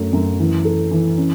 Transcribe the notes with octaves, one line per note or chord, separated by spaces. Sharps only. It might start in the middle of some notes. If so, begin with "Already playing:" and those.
Already playing: F#2 A3
F#2
E3
A4
E3
C#4